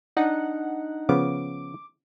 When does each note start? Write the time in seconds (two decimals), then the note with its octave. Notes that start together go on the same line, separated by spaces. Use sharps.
0.17 D4 D#4 F#5
1.09 C#3 F3 B3 D6